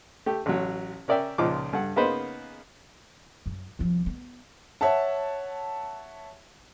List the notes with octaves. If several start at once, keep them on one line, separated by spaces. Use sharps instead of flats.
A3 G4
A1 F#3
C#4 A#4 D5 E5 G5
C#2 A#2 F3 D#4 D6
G2 A4 F#5
C#3 A#3 B3 D#4 B4 C5
F#2
C2 F3
B3
C#5 E5 F#5 A5